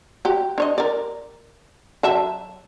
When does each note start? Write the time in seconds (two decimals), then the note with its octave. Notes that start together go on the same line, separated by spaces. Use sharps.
0.25 F#4 G4
0.58 D4 C#5 D#5
0.78 A#4 D5
2.03 F#3 E5 A5